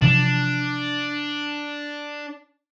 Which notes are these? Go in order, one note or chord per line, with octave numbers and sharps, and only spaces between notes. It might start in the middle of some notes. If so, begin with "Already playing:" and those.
C3 E3 F3 D4